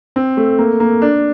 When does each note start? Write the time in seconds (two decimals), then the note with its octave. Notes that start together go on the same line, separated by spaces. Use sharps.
0.16 C4
0.37 A3
0.59 A#3
0.80 A#3
1.02 D4